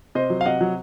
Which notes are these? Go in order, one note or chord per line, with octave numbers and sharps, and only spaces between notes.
C3 C5 D#5
F#3
F5
C3 D#5 F#5
F#3